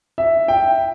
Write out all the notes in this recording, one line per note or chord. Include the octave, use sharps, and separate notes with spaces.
E5
G5